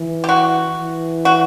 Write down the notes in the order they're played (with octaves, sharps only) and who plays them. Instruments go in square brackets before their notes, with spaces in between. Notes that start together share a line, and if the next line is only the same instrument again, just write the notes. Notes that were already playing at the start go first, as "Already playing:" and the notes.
Already playing: [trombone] E3
[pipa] G4
F#4
[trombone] E3
[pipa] F#4